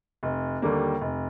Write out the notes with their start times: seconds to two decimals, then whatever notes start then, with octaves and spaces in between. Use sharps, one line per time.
0.23 F1
0.62 D#2 D3 G3 A#3
1.01 F1